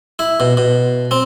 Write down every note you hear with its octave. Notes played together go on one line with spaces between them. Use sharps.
E4
B2
B2
C4